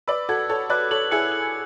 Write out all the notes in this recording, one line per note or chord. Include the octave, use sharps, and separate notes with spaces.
B4 D5 E6
F#4 A4 G#6
A4 C#5 G#6
B4 D5 F#6
A4 C#5 F#7
E4 G#4 C#7
F#7